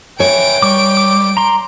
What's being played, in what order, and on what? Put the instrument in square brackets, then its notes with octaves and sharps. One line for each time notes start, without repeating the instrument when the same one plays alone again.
[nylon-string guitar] C#5 [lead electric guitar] E5 G#5 [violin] G5 D7
[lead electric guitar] G3 [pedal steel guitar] C#6 D6
[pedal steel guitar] D6
A#5 C6